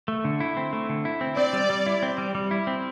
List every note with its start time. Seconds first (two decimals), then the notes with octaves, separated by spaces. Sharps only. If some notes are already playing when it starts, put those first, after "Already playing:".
0.08 A3
0.25 D3
0.40 E4
0.57 C4
0.73 A3
0.89 D3
1.05 E4
1.21 C4
1.37 C4 D5
1.53 G3
1.70 G3
1.86 E4
2.03 C4
2.18 G3
2.35 G3
2.51 E4
2.67 C4